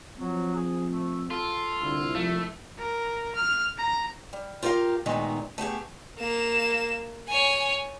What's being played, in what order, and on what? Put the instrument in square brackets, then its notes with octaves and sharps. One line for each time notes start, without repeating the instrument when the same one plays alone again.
[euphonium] F3 [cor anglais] F#3 [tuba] C4
[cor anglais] G#4
A3
[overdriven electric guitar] F4 [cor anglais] A4
[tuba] C2 [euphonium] D3 [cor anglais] E4
[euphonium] F3 [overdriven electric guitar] A3
[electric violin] A#4
F6
A#5
[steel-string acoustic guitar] G3
F4 G4 A#4 D5 F5
A#2 D#3 G#3 A3 B3 D#4
A3 B3 G4 G#4
[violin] A#3 E7
C#5 G#5